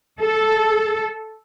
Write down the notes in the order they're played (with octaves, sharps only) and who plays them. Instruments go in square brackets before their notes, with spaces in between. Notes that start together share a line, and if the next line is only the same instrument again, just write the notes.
[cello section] A4